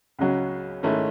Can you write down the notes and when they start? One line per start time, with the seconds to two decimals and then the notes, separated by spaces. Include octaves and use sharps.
0.19 C#2 C#3 F#3 C#4 F#4
0.83 G#2 D#3 A3 C#4 E4